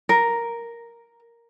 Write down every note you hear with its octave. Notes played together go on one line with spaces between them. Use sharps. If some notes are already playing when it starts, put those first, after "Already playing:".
A#4